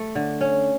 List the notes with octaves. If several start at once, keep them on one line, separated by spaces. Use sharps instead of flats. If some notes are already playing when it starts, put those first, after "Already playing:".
Already playing: A3
D3
C#4